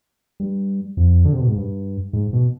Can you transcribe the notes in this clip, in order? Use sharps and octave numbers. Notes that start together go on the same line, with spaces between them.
G2
F2
D3
C3
B2
G#2
G2
G#2
B2